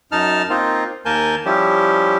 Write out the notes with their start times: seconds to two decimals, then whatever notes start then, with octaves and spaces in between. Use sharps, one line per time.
0.12 F#2 D#4 A5 F6
0.50 A#3 C4 D#4 F4
1.05 D#2 A#3 A#4 G#5 A5 G6
1.45 F3 G3 C#4 E4 G4